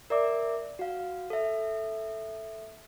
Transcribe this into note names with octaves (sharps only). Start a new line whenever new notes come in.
A#4 D5 E5 D6
F#4 F5
A4 E5